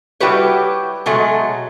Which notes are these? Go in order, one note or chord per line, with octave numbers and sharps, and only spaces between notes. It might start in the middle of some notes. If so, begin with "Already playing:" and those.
G3 E4 F#4 G4 B4 C#5
B2 F#3 G#3 A3